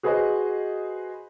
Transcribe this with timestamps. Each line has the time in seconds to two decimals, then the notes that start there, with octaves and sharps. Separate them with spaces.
0.03 F#4 G#4 B4 C5 D#5